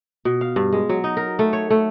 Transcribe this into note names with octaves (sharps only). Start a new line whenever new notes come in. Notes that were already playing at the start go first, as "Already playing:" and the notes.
B2
F5
G2
G#3
F#3
D#4
A#4
A3
C#5
A3